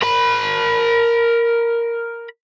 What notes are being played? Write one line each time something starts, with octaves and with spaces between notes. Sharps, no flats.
A#4 B5